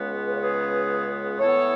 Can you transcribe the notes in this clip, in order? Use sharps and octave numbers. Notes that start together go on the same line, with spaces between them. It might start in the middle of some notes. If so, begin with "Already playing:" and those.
Already playing: C#2 C#3 G#3 B3
B4
C#5
G#4 B4
A2 E3 B3 A4 C#5